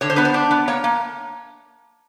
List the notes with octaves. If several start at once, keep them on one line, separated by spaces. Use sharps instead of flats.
D3 C#5
C5
B3 B4
C5
D4
B3
A#3 C#5
A#3